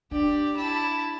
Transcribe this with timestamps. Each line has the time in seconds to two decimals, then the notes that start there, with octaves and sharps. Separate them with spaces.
0.11 D4 G4 D5
0.56 E4 A5